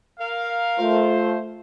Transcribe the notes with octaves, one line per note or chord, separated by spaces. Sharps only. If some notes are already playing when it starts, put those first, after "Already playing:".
A#4 F5
A3 F4 C5